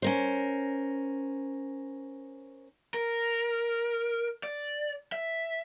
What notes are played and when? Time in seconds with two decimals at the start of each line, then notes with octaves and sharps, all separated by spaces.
0.02 C#4 A#4 C5
2.94 A#4
4.43 D5
5.12 E5